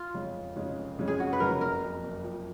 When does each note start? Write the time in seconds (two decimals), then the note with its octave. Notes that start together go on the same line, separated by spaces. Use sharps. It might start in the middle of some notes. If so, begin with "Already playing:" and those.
Already playing: F4
0.14 F2 C#3 G#3 C#4
0.35 F1
0.56 F2 C#3 G#3 C#4
0.78 F1
0.99 F2 C#3 G#3 C#4
1.08 G#4
1.19 F1 F#4
1.33 B4
1.40 F2 C#3 G#3 C#4 A#4
1.61 F#1 A#4
1.83 F2 F3
2.04 F#1
2.24 F2 F3